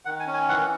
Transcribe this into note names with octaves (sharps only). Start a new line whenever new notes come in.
D#3 F#5
G#5
C#4
G#5
E3 F#5